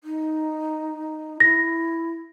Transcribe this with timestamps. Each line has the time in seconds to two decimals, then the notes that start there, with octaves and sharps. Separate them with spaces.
0.04 D#4
1.40 E4 A#6